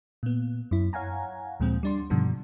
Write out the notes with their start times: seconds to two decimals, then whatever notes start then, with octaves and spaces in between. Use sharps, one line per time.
0.23 A#2 B3
0.71 F#2 E4
0.93 C#5 F5 F#5 G#5 A#5
1.60 D2 A#2 F3 G#3 C4
1.83 G3 D4 C6
2.10 G2 B2 D3 D#3 F3 G3